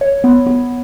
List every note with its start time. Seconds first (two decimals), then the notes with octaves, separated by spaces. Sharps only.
0.01 C#5
0.24 B3
0.47 B3